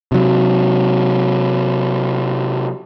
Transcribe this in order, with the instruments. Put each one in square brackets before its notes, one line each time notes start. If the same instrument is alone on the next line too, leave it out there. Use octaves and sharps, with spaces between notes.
[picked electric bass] C3 F#3